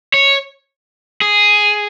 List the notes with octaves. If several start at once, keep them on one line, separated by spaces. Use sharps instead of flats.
C#5
G#4